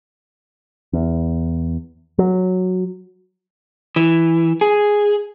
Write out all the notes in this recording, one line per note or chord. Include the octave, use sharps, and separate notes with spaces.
E2
F#3
E3
G#4